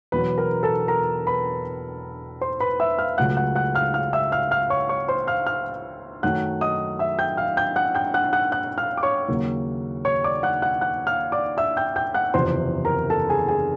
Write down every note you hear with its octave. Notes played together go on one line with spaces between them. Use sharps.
E1 E2 B2 F#3 B4 B5
A#4 A#5
A4 A5
A#4 A#5
B4 B5
C5 C6
B4 B5
E5 E6
F5 F6
C#2 C#3 F#3 A3 F#5 F#6
F#5 F#6
F#5 F#6
F5 F6
F5 F6
E5 E6
F5 F6
F5 F6
C#5 C#6
C#5 C#6
C5 C6
F5 F6
F5 F6
F#2 D#3 F#3 A3 F#5 F#6
D#5 D#6
E5 E6
G5 G6
F5 F6
G5 G6
F#5 F#6
G5 G6
F#5 F#6
F#5 F#6
F#5 F#6
F5 F6
D6
C#5 C#6
D#2 C#3 F#3 A#3
C#5 C#6
D5 D6
F#5 F#6
F#5 F#6
F#5 F#6
F5 F6
D5 D6
E5 E6
G5 G6
G5 G6
F#5 F#6
F#1 E2 C3 F3 C5 C6
A#4 A#5
A4 A5
G#4 G#5
G#4 G#5